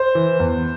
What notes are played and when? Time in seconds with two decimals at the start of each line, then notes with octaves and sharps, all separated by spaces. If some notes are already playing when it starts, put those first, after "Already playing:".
Already playing: C5
0.15 E3
0.40 E2